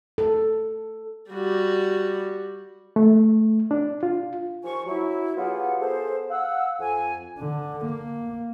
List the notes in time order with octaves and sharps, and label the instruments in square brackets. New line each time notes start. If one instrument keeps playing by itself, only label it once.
[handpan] A4
[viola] G3 F#4
[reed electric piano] A3
D4
F4
[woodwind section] D#2 F3 G#5 C#6
F#3 E4
F#3 B3 F4 G4 G#4 F#5
B3 G#4 A4 B4 C5
F5 F#5 E6
F2 G#5
[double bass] D3
A#3